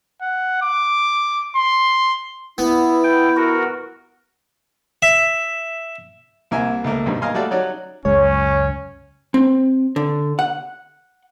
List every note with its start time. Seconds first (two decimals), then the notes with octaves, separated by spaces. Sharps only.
0.22 F#5
0.62 D6
1.56 C6
2.58 B3 E4
3.04 G5
3.37 F#4 A#4
5.02 E5
6.51 C2 A#3 E5 G#5
6.84 C#2 A3 A#3
7.06 B1 G2 D#3
7.22 A#3 D#5 F5 G#5 C6
7.34 G3 A3 F#4 A4 D5 F5
7.51 F#3 C#4 D#4 F#4 D5
8.05 C#2 F#2 G#3 C#4 C#5
9.34 C4
9.96 D3
10.39 F#5